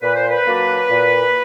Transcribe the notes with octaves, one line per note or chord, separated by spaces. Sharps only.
A#2 B4
C5
B4
F#3 A#3 D4
A#2